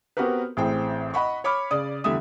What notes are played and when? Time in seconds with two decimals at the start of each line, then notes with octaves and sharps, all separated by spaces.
0.17 B3 C4 F#4 G4 A#4 B4
0.57 A1 A2 C4 G#4 G5
1.14 D#5 F#5 B5 C#6
1.44 C#5 B5 D6 F6
1.71 C#3 D5 D#6
2.04 E2 D3 G3 E5 D#6